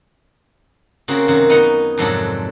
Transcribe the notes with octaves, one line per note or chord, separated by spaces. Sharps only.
C#3 A#3 C4 F#4 G#4
F#2 C3 D#3 F#4
B3 D#4 A#4 F#5
F2 G#2 C3 F#3 D4 A4